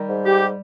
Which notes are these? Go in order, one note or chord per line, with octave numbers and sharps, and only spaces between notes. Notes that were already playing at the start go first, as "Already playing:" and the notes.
Already playing: D#3 G3
G#2
G4